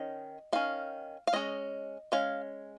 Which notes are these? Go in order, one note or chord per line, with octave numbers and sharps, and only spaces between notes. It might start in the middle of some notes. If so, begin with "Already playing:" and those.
Already playing: D#3 C#4 D#5
D#3 C#4 F5
F5
G#3 C#4 D#5
G#3 C#4 F5